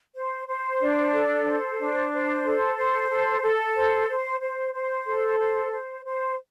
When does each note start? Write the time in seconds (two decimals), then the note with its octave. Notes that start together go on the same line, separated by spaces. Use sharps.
0.15 C5
0.47 C5
0.81 D4
1.13 A4
1.46 C5
1.79 D4
2.12 C5
2.44 A4
2.77 C5
3.10 A4
3.43 A4
3.75 C5
4.08 C5
4.41 C5
4.74 C5
5.06 A4
5.39 C5
5.72 C5
6.05 C5